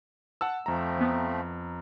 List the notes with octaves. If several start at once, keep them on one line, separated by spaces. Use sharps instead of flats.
F#5 A5 E6
F2 F3 A3 C4 A#5
E3 B3